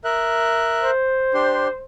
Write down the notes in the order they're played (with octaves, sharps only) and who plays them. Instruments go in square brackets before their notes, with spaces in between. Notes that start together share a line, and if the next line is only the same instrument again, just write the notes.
[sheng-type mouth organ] A#4 E5 F#6
[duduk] C5
[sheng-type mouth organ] D4 G4 C6